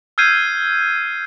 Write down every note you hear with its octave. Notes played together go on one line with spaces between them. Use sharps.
E6 F6 G6 G#6 C7 D#7